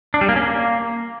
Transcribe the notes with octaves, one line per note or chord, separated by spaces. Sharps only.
D4
G3
A#3
C#4
A#3